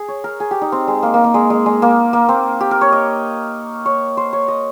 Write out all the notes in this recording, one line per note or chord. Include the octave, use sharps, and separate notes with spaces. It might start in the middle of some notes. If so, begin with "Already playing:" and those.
Already playing: G#4
C#5
A#4
G#4
G4
D#4
C4
G#3
A#3
A#3
A#3
G#3
G#3
G#3
A#3
A#3
C4
G4
A#4
C#5
D#5
C#5
C5
C#5
D#5